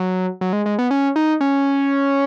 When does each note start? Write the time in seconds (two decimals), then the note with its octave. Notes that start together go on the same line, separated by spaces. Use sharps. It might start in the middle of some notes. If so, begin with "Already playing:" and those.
Already playing: F#3
0.41 F#3
0.53 G#3
0.66 G#3
0.79 B3
0.91 C#4
1.16 D#4
1.41 C#4